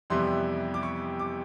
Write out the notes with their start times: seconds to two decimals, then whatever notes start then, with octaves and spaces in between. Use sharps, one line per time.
0.10 F2 C3 E3 G3 B3 C6
0.74 D6
0.83 C#6
1.19 D6